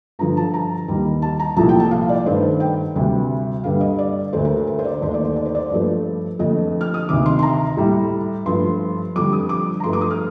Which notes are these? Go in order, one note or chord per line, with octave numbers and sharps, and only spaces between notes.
G2 D3 F3 A#5
A5
A#5
D#2 D#3 G3
A5
A#5
C2 A#2 F3 A3 A5
G5
A5
F5
D5
G2 D#3 A3 C5
G5
D2 C3 G3
G2 D3 G3 F5
D#5
D5
D2 D3 A3 C5
A#4
A4
A#4
C5
D5
D#2 D#3 A3 C5
D5
C5
D5
C5
D5
G2 F3 A3 D5
F2 D3 A3 D#5
F6
D#6
D2 C3 D#3 D6
C6
C6
A#5
A2 G3
G2 F3 A3 C6
F2 D3 G3 D6
D#6
D6
A#5
G2 F3 A3 C6
D6
D#6
F6